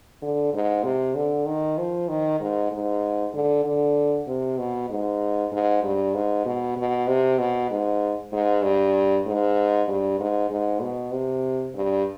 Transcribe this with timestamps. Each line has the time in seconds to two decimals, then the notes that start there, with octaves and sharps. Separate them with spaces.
0.22 D3
0.53 G#2
0.83 C3
1.15 D3
1.46 D#3
1.77 F3
2.08 D#3
2.40 G#2
2.72 G#2
3.33 D3
3.64 D3
4.27 C3
4.58 B2
4.90 G#2
5.52 G#2
5.83 G2
6.14 G#2
6.45 B2
6.76 B2
7.07 C3
7.38 B2
7.70 G#2
8.32 G#2
8.63 G2
9.26 G#2
9.88 G2
10.19 G#2
10.50 G#2
10.81 B2
11.12 C3
11.75 G2